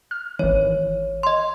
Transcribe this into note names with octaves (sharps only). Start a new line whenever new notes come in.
F6
G#1 D#3 E3 C#5
D#5 C6